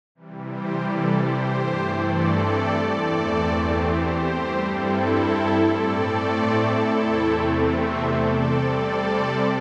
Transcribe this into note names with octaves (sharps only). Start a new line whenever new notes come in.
C3 E3 G3
G4 C5
A4 D5
G4 C5
G2 E3 A3 C4
A4 D5
E2 E3 A3 C4 A4 D5
G4 C5
G4 C5
G2 G3 C4
E4 A4
A2 A3 C4 A4 D5
E4 A4
E2 C3 A3 C4
C5 E5
A4 D5
C3 G3 C4
A4 D5